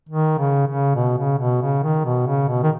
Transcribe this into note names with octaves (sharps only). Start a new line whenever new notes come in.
D#3
C#3
C#3
B2
C#3
B2
C#3
D#3
B2
C#3
B2
D#3